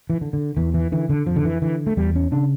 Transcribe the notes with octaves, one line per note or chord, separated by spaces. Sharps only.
E3
D3
D3
E2 E3
E3
D3 E3
D3
F2 F3
D3
E3
D3 E3
A3
E2 G3
C#4
C#3 D4